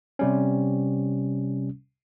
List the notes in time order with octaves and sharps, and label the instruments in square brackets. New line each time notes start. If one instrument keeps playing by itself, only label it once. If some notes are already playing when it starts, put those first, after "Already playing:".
[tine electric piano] C3 G3 C#4